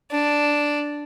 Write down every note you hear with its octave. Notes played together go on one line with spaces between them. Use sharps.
D4